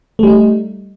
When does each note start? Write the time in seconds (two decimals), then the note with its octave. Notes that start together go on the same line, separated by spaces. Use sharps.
0.19 A3
0.23 G3
0.27 D#4